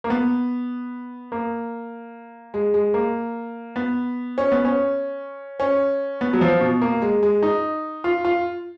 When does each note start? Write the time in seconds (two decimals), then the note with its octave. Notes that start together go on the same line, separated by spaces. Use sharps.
0.04 A#3
0.10 B3
1.32 A#3
2.54 G#3
2.74 G#3
2.94 A#3
3.76 B3
4.38 C#4
4.52 B3
4.65 C#4
5.60 C#4
6.21 B3
6.33 F#3
6.41 F3
6.61 B2
6.82 A#3
7.02 G#3
7.23 G#3
7.43 D#4
8.04 F4
8.25 F4